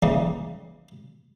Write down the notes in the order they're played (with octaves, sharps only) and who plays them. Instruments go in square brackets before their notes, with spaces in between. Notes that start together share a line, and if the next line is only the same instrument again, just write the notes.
[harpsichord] C#3 E3 G3 A#3 C#4 D#4